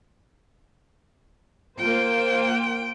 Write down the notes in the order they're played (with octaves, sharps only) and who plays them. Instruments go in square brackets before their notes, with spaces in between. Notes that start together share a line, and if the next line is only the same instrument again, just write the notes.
[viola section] A#3 F4 C5 [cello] G5